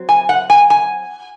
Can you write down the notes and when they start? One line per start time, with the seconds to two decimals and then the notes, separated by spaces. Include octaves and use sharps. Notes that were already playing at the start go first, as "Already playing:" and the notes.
Already playing: F#3 C4
0.09 G#5
0.29 F#5
0.50 G#5
0.70 G#5